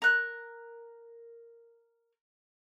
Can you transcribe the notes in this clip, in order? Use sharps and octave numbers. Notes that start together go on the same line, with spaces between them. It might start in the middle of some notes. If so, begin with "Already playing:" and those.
A#4 F#6